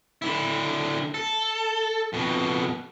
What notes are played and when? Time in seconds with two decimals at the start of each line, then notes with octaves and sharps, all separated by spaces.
0.22 D3 E4
1.14 A4
2.13 F2 B2